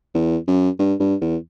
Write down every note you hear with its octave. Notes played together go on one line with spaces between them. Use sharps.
E2
F#2
G2
G2
E2